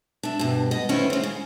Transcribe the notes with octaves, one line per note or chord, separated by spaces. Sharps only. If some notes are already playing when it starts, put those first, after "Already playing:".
D4 E5
G2 B2
B3 D#5
D2 D#3 C#4 E4 B4 C5
C#3 G#3
C#3